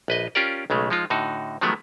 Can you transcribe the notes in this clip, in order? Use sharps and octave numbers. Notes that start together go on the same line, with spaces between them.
A#1 B4 D#5
C#4 F4 G4 A#4 D5
B1 C#3 G#3 A3
F3 G#3 D#4 F4
A2 D3 D#4 F#4
D#3 F3 F#3 G#3 A3 B3